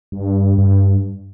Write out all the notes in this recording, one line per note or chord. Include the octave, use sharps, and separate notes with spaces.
G2
G2